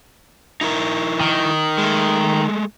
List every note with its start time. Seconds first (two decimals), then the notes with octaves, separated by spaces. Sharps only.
0.61 D#4 E4 A#4
1.21 D#3
1.78 G#3 A3